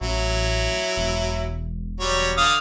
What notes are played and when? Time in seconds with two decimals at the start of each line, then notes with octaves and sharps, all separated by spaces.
0.01 A1 F#3 E4
0.97 E1
2.00 F#3 G3 C#5
2.37 D3 F5 D#6